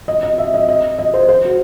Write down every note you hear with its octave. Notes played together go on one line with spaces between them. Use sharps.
D#5
D#5
E5
D#5
D#5
D#5
C5
C5
F#4